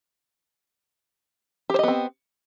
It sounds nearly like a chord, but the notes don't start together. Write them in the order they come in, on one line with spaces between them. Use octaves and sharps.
G4 C5 D#5 B3 C4